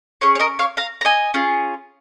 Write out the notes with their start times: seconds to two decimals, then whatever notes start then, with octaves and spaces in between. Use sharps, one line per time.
0.21 C#4 G#4 C#5
0.35 C#5
0.39 A#4 D#5
0.59 C#5 F5
0.77 F5 A#5
1.01 A#5
1.05 D#5 G#5
1.34 C#4 F4 G#4